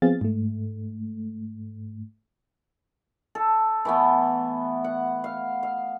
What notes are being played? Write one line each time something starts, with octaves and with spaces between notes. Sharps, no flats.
F3 B3 C4 G#4 F5 A6
G#2 A3
A4
E3 A3 B3
F#5
F5
F5